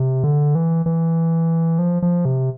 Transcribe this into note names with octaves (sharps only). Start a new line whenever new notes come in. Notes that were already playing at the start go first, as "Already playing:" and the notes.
Already playing: C3
D3
E3
E3
F3
F3
C3